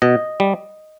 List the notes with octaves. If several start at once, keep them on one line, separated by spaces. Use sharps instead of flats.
B2 D#5
G3